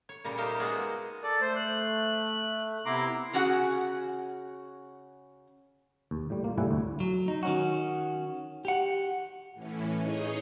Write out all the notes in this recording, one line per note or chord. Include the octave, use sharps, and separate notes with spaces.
C#5
A#2 C#3 G3 A#5
A#3 D#4 G4 C5 E5 F5
G#3 A#3 B3 F#4 G#4
A4 D5
A3 C5
F#6
C3 B3 E4 A#5 C6 D6
C#3 C#4 F#4 G#4 F#5
D#2
A2 G3
A#3 F4
A2 C3 G3 E4 F#5 G#5
D2
F#3
D#4
D#3 C#4 F#4
G4 F#5
A2 E3 C#4
D#4 G#4 C#5 D#5